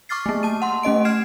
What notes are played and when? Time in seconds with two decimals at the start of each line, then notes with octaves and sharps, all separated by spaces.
0.09 C#6 D6 F6 A6 C7
0.26 A3 A#3
0.43 A5 D#7
0.62 F#5 C6
0.83 A3 C#4 D#5 D7
1.05 F6 G#6 C7 E7